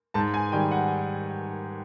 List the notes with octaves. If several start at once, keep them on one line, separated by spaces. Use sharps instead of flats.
G#2 A5
G#5
D#3 G3 G5
F#5